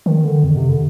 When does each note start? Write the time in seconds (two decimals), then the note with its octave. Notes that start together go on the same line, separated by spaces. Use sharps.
0.06 D#3
0.24 D3
0.44 F2
0.57 C3
0.69 D3